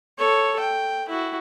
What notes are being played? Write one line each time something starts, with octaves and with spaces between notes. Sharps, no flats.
A4 C#5
G5
E4 F#4